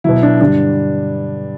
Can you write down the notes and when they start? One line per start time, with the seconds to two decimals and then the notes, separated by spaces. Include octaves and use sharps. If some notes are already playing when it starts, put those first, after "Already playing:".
0.04 B2 F#3 E4
0.23 D4
0.41 G2 D3 G3 D4